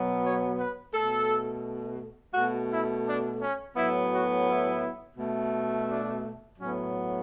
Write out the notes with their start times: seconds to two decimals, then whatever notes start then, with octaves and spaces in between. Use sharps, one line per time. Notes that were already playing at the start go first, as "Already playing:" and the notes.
Already playing: B2 F#3 B3
0.23 C#5
0.58 B4
0.93 B2 A3 A4
2.34 B2 A3 F#4
2.70 E4
3.06 D4
3.40 C#4
3.75 A2 F#3 B3 E4
4.11 F#4
4.46 E4
5.17 B2 A3
5.88 D4
6.58 A2 F#3 B3 C#4